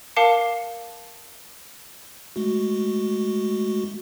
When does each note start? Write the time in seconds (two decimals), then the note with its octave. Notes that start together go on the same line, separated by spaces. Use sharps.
0.16 A#4 F5 A5 D6 C7 C#7
2.36 G#3 A3 F#4